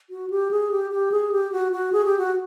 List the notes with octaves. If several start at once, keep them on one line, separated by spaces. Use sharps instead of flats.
F#4
G4
G#4
G4
G4
G#4
G4
F#4
F#4
G#4
G4
F#4